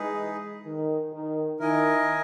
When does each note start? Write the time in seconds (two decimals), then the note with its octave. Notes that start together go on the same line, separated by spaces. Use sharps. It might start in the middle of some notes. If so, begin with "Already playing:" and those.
Already playing: E3 G#3 D#4 G#4 B4
0.65 D#3
1.13 D#3
1.60 D#3 E4 A#4 D#5 G#5